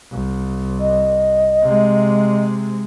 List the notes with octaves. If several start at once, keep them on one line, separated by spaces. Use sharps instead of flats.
C2
D#5
C3 G#3